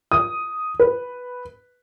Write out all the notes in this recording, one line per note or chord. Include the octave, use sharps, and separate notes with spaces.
D#6
B4